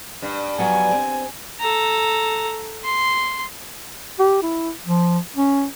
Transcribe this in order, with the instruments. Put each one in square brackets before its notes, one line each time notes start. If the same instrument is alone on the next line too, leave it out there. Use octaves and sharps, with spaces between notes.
[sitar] G2
[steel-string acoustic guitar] F3 F#3 B3 [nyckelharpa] G#5
[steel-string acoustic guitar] C4
[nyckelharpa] A4 A#5
C6
[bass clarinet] G4
E4
F3
C#4